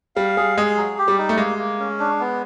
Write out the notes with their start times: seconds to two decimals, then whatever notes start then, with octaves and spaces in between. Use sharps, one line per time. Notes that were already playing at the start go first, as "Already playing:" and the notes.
0.16 G3 F5
0.37 G3 G#4
0.58 G#3 G#4
0.77 F#3
0.98 G4
1.08 G3
1.18 D#4
1.29 A3
1.38 G#3 A#3
1.58 A#3
1.79 C#4
1.99 D4
2.20 B3